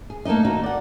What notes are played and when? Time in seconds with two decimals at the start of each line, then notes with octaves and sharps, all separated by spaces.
0.10 G#4
0.25 A3 A#3 D4 D#4 D#5
0.45 D#2 D#4 F#4
0.63 D5 F#5